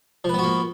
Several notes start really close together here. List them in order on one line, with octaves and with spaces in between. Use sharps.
F3 B4 B3 F#4 A#3